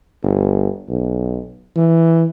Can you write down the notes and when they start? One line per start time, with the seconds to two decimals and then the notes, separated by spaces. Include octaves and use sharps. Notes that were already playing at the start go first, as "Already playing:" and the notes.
0.23 G1
0.89 B1
1.76 E3